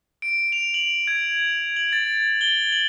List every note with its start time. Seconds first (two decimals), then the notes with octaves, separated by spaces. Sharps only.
0.22 D7
0.52 F7
0.74 F#7
1.07 G#6
1.76 F#7
1.93 A6
2.41 G7
2.72 F#7